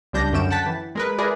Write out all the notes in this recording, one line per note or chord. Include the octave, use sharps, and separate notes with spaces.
C#2 G3 D4 G6 A#6
F#2 D3 C#4 G5 D7 E7
F#5 G5 A5 A6 B6
E3
G#3 A#4 B4
E4 G#4 A#4 B4 D5